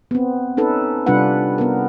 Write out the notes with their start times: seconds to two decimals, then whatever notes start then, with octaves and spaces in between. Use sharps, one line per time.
0.11 B3 C4
0.57 C#4 D#4 A4 B4
1.06 C3 G3 D4 F4 B4 F#5
1.58 B3 A#4